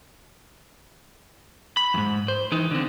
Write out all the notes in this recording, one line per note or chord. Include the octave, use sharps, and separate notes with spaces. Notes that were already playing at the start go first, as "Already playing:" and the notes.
B5
F2 G#2
C5
E3 D#4
D3 C4